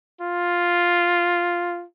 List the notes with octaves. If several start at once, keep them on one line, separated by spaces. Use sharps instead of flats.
F4